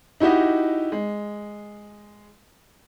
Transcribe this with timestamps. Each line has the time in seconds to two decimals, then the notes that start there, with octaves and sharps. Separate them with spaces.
0.20 D#4 E4 F#4 G4 D#5
0.92 G#3